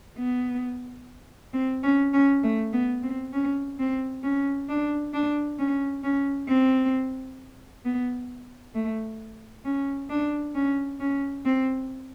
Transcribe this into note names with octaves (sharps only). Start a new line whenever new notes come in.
B3
C4
C#4
C#4
A3
B3
C4
C#4
C4
C#4
D4
D4
C#4
C#4
C4
B3
A3
C#4
D4
C#4
C#4
C4